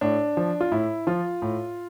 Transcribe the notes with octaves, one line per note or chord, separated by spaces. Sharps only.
A2 D4
F3
F4
A2 E4
F3 F4
A2